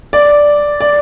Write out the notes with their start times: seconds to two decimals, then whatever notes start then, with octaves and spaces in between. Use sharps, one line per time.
0.13 D5
0.81 D5